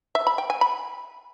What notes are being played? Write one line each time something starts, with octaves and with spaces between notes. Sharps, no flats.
E5
B5
G5
G#5
B5